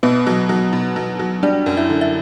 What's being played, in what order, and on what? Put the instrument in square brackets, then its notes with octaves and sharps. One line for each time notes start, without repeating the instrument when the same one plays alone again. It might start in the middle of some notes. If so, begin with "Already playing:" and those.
[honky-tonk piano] B2 [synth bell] B3 B4
[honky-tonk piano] F#3
F#3
B2
F#3
F#3
[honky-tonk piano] G3 [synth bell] D4 D5
[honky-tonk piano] F#2
[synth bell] E4 E5
[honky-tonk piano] D3
[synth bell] E5